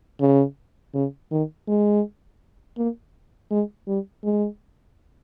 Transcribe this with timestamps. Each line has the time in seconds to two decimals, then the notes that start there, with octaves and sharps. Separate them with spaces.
0.21 C#3
0.94 C#3
1.31 D#3
1.68 G#3
2.77 A#3
3.51 G#3
3.87 G3
4.24 G#3